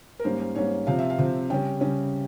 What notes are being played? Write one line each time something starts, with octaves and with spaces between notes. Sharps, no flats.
A#4
G#2 G3 A#3 C#4 C5
C5
G#2 G3 A#3 C#4 C#5
C3 F3 C4 F5
E5
F5
C3 F3 C4
C#3 G3 C#4 G5
C#3 G3 C#4